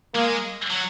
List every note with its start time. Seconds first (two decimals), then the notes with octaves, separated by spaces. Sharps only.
0.14 G#3 A#3
0.70 F#3